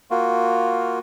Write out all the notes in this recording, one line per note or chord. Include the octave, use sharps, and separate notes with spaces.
A#3 F4 F#4